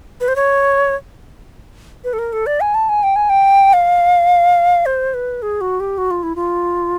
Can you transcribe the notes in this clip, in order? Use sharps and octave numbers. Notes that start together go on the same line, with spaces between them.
B4
C5
C#5
B4
A4
A#4
A4
D5
G#5
A5
G#5
G5
G#5
G5
F5
C5
B4
G#4
F#4
G4
F#4
F4
E4
F4